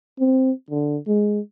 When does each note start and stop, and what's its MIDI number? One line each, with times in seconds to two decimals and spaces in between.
0.19 0.51 60
0.70 0.97 50
1.07 1.40 56